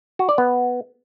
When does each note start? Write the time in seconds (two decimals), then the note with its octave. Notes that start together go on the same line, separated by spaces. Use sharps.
0.19 F#4
0.29 D5
0.38 B3